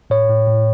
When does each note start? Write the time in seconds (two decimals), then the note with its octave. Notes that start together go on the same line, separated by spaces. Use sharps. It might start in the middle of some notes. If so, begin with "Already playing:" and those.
0.10 A2 C#5
0.29 A2
0.47 A2